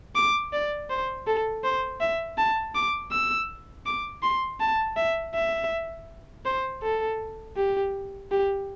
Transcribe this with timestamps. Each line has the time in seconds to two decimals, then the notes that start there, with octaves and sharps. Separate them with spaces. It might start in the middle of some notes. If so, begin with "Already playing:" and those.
0.16 D6
0.53 D5
0.90 C5
1.27 A4
1.64 C5
2.01 E5
2.38 A5
2.75 D6
3.12 E6
3.86 D6
4.23 C6
4.60 A5
4.97 E5
5.35 E5
6.46 C5
6.83 A4
7.57 G4
8.32 G4